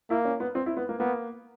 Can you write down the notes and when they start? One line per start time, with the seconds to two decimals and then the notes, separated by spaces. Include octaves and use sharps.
0.10 A#3 E4
0.25 C#4
0.40 B3
0.55 C4
0.66 E4
0.77 B3
0.89 A#3
0.99 A#3 B3